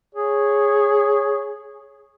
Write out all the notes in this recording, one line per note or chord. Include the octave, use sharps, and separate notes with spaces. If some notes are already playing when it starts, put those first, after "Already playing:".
G#4 C#5